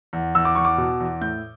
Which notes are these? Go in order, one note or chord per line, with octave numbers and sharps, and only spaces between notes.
E2
E2 E6
D6
E2 C#6
D6
B2
E2
A2 G6